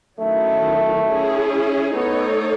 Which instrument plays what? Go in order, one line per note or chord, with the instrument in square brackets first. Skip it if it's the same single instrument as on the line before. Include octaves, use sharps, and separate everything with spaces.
[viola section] D#3 F#3 C#4 E4 [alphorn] A3
[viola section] C#4 E4 G#4
[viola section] A3 D#4 A4 C#5 [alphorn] B3